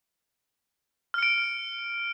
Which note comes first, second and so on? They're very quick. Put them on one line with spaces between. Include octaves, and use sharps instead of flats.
F6 C#7 D7